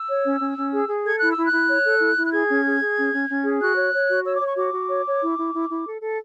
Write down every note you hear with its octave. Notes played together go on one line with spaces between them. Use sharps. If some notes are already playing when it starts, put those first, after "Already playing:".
Already playing: E6
C#5
C#4
C#4
C#4
G#4
G#4
A4 G#6
E4 F#6
E6
E4
F#6
E4
C#5
A4
E4
E4
F#6
G#4 G#6
C#4
G#4
G#4
C#4
C#4
C#4
G#4
F#4 F#6
C#5
C#5
F#4
C#5 E6
D6
C#5 C#6
F#4 D6
F#4
C#5
C#5
E4
E4
E4
E4
A4
A4